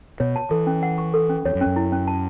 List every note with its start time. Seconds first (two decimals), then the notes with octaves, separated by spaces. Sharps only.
0.20 B2 C#5
0.36 A5
0.51 E3 A4
0.67 C#4
0.83 F#5
0.98 C#6
1.14 A4
1.29 C#4
1.45 E2 C#5
1.55 F#2
1.61 C#4
1.66 F#2
1.76 E4
1.92 C#4
2.08 A5